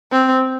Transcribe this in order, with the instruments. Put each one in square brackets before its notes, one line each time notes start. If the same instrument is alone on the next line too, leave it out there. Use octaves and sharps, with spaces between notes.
[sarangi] C4